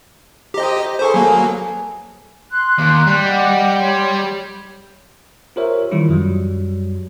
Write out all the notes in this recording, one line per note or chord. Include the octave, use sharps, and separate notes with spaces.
G4 C5 D#5 A#5
G#4 A4 B4 C5 C#6
F#3 A#3
C6 F#6
D#2
G3
D#5 F#5 D6
C#5 C6
F4 G4 A#4 C5 C#5 E5
D#3 E3 G3 E4 F4
F#2 F#3 G3